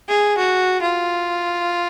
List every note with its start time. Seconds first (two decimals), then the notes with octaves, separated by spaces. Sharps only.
0.08 G#4
0.38 F#4
0.82 F4